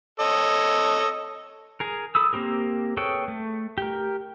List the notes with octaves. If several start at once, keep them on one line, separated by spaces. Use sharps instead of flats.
A4 C#5 D#5
G#4 A#4
A4 B5 D#6 E6
A#3 C4 G4 A#4
G#4 A4 B4 C#5 G5
A3
G4 A#4